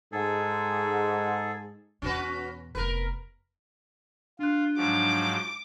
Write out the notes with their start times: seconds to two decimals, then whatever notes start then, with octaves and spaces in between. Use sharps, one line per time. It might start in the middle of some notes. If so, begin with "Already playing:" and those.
0.12 G#2 G#4 A4
2.02 E2 B2 C#4 F#4 B4
2.75 F1 B3 A#4 B4
4.39 D4 F4 F#6
4.76 G#2 F3 F#3 D6